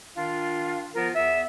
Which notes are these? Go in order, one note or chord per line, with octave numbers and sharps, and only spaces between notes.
D#3 D4 F4
F3 B3 F4 A#4
E2 B3 E5